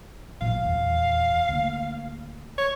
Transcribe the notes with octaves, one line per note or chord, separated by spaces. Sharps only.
A1 A#2 F#3 F5
D#1 E2
D2 A#3
C#5